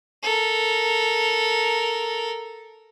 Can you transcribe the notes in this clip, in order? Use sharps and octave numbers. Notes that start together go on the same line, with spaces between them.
A4 A#4